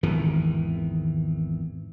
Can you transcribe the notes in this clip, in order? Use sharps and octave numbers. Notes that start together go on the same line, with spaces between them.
G#1 E2 D#3 E3